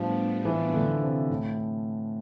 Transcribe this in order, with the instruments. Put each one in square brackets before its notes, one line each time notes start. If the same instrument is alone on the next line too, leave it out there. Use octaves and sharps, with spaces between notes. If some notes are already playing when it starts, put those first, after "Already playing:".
Already playing: [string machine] A2 G3 B3 D4 [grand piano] F3
[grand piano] E3
D3
C3
A2